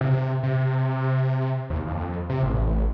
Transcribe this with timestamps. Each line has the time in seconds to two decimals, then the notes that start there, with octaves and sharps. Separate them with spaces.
0.01 C3
0.43 C3
1.70 D#2
1.87 F2
2.30 C3
2.43 A1